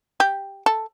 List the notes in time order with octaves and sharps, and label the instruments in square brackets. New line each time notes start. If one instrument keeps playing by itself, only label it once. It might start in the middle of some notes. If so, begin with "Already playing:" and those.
[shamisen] G4
A4